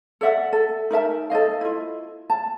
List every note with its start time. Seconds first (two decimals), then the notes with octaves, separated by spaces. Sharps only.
0.21 A4 D5 E5 F#5
0.53 A4
0.90 D#4 A#4 E5 A5
1.30 A4 C5 D#5 F5
1.61 E4 F4
2.30 A5